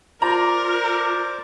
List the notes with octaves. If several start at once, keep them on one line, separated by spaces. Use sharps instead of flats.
F4 A#4 C5 D5 A#5 D6